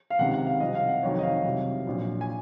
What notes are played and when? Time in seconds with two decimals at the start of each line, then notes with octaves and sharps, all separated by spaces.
0.10 F5
0.19 C#2 C3 D#3 F#5
0.34 F#5
0.47 F5
0.60 C2 C3 F3 D#5
0.75 F5
0.89 F#5
1.02 F1 F2 D#3 F#3 C#5
1.19 D#5
1.23 F5
1.44 C2 C3 F#3
1.87 A#1 A#2 F#3
2.21 G#5